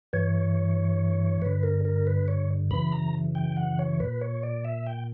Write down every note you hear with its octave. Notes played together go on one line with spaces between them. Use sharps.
G2 E3 C#5
G2 D3 B4
A#4
A#4
B4
C#5
F#2 C#3 E3 B5
A#5
G5
F#5
C#5
A#2 B4
C#5
D5
E5
G5